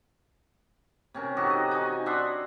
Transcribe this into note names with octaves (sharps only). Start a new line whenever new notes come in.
C3 C#4 A#4
D#4 F#4 G4 A4
D#5
D#4 F#4 G#5
D4 E5 F#5 C6